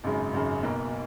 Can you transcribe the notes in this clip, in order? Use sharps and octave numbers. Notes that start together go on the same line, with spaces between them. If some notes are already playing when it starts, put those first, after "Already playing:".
G#1 F#2 C#3 G#3
G#1 F#2 C#3 G#3
B1 B2 A#3